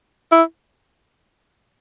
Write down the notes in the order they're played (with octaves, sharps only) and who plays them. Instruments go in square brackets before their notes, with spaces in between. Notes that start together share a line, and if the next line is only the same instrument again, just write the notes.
[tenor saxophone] E4